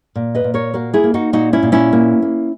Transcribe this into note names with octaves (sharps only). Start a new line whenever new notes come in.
A#2
B4 D#5
A#2
A#4 C#5
A#3 F#4 A#4
E4 G#4
A#3
D#4 F#4
A#2 D#4 F#4
C#4 E4
A#2
C#4 E4
A#3
A#3